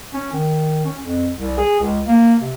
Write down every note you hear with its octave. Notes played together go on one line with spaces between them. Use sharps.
C#4
D#3
C#4
F2
C2
G#4
C#2
A#3
C3